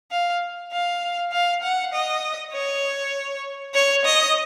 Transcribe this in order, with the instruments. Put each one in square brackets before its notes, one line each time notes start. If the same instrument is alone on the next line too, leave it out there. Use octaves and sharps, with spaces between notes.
[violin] F5
F5
F5
F#5
D#5
C#5
C#5
D#5